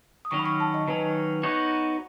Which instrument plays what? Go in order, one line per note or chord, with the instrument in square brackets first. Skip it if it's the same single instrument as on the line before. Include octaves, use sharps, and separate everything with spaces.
[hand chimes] D#6
[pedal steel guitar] D#3 F#3 C#4 [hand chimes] C#6
[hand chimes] B5
C#6
A5
D#5
[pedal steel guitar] D#3 F#3 C#4 [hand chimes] B4
[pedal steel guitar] B3 D#4 F#4 C#5